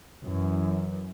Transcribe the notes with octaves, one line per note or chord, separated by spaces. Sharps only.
F#2 E3